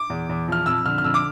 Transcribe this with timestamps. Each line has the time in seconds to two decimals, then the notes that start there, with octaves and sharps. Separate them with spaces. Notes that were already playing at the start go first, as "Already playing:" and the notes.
Already playing: D6
0.10 E2
0.29 E2
0.48 F3 F6
0.66 F2 E6
0.86 D3 F6
0.98 F6
1.04 F2 E6
1.14 D6